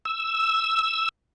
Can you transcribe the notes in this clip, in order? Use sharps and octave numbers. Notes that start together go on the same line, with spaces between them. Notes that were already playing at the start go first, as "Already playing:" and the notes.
E6